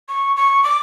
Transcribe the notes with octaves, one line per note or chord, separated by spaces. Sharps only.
C#6
C#6
D6